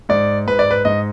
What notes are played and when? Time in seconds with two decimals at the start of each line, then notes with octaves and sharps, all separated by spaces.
0.09 G#2 D5
0.47 G#2 B4
0.59 D5
0.71 B4
0.85 G#2 D#5